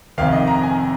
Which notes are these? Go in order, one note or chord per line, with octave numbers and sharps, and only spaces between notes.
F1 F2 C3 D#3 F5
D#5
A#5
G#5